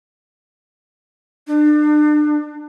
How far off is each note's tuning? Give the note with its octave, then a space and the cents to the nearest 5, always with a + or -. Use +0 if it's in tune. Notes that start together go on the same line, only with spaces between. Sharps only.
D4 +35